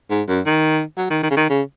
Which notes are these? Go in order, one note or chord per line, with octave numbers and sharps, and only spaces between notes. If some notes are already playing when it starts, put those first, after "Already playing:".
G#2
F#2
D#3
F#3
D#3
D#3
C#3
D#3
C#3